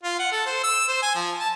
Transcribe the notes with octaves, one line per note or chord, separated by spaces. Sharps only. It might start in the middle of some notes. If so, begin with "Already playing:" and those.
F4
F#5
A4
C5
E6
C5
G#5
F3
A5